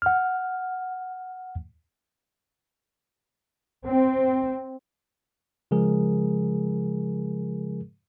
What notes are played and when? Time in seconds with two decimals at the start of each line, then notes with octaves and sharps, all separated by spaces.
0.02 F#5 F6
3.85 C4
5.71 C#3 F3 G#3 G#4 A#4